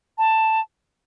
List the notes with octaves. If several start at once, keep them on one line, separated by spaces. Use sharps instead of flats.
A5